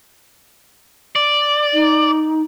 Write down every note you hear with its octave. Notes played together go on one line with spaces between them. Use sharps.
D5
D#4